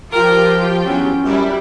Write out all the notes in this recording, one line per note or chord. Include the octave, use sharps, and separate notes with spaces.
F3 F4 G4 A#4 G5
E2 G2 F#3 C#4
F#2 G3 E4